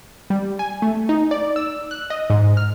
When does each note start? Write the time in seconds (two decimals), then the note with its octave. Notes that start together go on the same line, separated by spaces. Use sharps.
0.30 G3
0.59 G#5
0.82 A3
1.09 D#4
1.31 D5
1.56 E6
1.91 F#6
2.10 D#5
2.30 G#2
2.57 F6